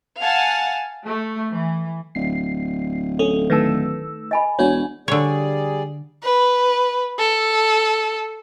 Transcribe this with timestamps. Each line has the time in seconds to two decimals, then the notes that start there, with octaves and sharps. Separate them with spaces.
0.20 F5 F#5 G#5 A5
1.04 A3
1.52 E3
2.15 D1 C7
3.19 C#4 A4
3.50 D#3 A3 B4 A5 E6
4.31 D#5 G#5 B5
4.59 E1 D4 F#4 C#5 G#5
5.08 D3 G3 G#4 C#5 D5
6.23 B4
7.19 A4